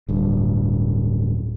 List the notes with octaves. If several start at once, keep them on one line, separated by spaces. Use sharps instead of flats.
D1 G2